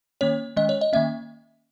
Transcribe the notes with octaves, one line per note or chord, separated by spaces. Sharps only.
D#3 A#3 C#4 C#5
D#3 G#3 C#4 D#5
C#5
D#5
D#3 A#3 C#4 E5